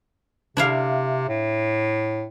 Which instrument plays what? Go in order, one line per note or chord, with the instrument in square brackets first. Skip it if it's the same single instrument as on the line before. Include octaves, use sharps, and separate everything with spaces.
[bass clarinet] C3 [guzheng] D4 E4 F5
[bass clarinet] A2